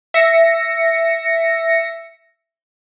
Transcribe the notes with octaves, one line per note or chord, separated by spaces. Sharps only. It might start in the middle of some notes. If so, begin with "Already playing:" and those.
E5 A#6 C#7